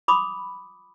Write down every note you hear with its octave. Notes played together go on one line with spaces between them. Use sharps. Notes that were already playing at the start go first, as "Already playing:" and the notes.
F4 B5 C6 D6 D#6